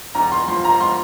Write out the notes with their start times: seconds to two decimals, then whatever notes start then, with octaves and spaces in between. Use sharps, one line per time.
0.15 E2 A#5
0.32 C6
0.48 F3 C6
0.65 A#5
0.80 F3 C6